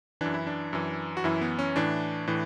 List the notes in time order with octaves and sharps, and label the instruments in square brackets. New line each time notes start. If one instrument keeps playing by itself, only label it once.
[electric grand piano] F#2 E3 D4
E4
D4
F#2 E3
F#4
F#2 E3 E4
B3
C#4
A2 E3 D4
A2 E3